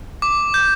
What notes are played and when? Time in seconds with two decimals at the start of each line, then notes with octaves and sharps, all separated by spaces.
0.22 D6
0.54 G6